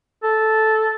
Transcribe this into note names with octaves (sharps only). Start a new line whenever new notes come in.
A4